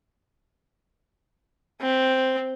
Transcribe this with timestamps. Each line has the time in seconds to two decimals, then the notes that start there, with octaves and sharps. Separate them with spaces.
1.82 C4